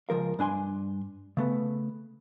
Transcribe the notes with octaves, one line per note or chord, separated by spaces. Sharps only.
C#2 F3 A#4 F5
G2 D4 G#5 C6
C#3 A3 B3